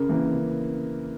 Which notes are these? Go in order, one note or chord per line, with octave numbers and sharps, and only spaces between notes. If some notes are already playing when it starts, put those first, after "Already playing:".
Already playing: C#3 A#4
E3 A#3
C#3